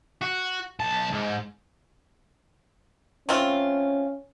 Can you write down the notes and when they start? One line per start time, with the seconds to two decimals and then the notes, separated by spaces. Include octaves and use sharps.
0.22 F#4
0.80 B1 A5
1.13 G#2
3.29 A3 C4 C#4 F4